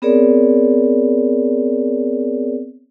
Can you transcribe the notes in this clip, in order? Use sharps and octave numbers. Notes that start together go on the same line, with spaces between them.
B3 C4 G#4 A#4 C#5 D5